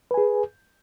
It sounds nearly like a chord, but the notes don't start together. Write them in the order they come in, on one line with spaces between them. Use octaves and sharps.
B4 G#5 G#4